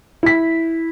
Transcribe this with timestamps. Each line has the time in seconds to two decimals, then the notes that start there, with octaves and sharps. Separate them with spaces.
0.23 E4 B6